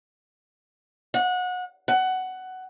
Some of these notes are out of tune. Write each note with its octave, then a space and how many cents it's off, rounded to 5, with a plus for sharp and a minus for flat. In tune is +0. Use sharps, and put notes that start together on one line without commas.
F#5 -25
F#5 +15